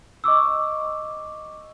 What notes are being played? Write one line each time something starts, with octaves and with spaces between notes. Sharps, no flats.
D#5 C#6 D6 E6